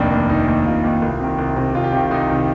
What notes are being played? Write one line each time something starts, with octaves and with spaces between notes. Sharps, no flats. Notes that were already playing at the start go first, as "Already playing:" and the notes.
Already playing: F1 D#2 D#3 A#3 D4
D#2 D#3
F1 D#4
D#2 D#3
F1 F4
D#2 D#3
C2
C3 D#3
C2
C3 D#3
C2 F4
G4
C3 D#3 F4
C2 D#4
C3 D#3